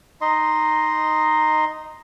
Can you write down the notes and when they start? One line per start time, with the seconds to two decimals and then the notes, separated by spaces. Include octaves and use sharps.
0.21 D#4 D#5 C6